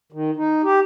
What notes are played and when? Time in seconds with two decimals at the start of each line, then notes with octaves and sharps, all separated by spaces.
0.12 D#3
0.37 D#4
0.64 G4